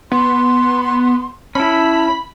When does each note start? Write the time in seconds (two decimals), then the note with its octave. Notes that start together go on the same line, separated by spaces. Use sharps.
0.12 B3 C6
1.55 C#4 E4 A5 B5